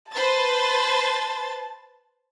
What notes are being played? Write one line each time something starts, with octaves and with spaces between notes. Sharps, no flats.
B4 C5 A5 A6